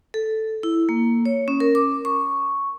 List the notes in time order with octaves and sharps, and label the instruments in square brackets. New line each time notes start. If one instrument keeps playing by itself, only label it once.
[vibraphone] A4
E4
A#3
C#5
C#4
A#4
D6
C#6